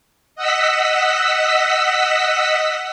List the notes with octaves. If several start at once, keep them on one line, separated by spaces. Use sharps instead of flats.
D#5 F#5 E6 B6